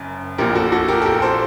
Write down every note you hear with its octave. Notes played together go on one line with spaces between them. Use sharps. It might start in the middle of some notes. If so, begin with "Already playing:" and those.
Already playing: F#1 F#2
A#1 A#2 G4 A#4
F#4 A4
F#4 A4
G4 A#4
A4
G4 A#4
A4 C5